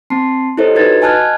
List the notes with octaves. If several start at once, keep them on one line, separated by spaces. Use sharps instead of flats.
C4 A5 C6 C7
E4 G4 A4 C5 C#5 D#5
D#4 E4 F#4 B4 G#6 A6
D#5 G#5 A5 F6 F#6 G#6